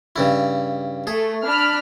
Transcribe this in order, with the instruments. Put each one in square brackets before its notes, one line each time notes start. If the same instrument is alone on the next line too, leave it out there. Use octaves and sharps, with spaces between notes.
[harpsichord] G2 C#3 E4
[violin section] A3 [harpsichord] G#4
[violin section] D4 B5 F6